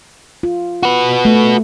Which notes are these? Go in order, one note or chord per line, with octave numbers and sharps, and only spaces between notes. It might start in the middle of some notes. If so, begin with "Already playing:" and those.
F4
F#4 B4
A3